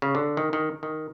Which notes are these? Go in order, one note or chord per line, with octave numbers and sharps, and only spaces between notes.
C#3
D3
D#3
D#3
D#3